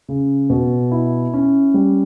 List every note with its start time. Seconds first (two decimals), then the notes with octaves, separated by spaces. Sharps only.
0.09 C#3
0.50 B2
0.91 E4
1.34 C#4
1.74 G3